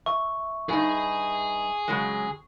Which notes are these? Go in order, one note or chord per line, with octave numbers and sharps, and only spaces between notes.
E5 C#6
G2 D#4 G#4 G#5
C#3 F#3 G#3